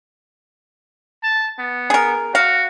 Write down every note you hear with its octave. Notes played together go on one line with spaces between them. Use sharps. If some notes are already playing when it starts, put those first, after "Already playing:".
A5
B3
G#4 A#4
F#4 F5